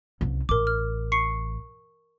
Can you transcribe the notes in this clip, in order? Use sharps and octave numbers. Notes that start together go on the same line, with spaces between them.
C2 C#3
A1 A#4 D6
F6
C#6 C7 C#7